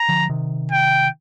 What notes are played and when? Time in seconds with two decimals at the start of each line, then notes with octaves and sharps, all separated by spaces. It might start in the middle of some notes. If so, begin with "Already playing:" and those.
Already playing: A#5
0.08 D3 F3
0.29 C3 D#3
0.71 G5